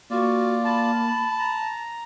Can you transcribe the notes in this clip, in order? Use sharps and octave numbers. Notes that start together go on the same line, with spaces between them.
A#3 F4 F#4 D5
A5 B5
A#5